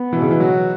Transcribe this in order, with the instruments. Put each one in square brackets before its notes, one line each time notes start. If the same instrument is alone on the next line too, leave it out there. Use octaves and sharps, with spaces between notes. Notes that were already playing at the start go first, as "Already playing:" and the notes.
Already playing: [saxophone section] B3
[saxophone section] B2 [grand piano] E3
[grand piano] C#3
E3
[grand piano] F#3 [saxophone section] F#4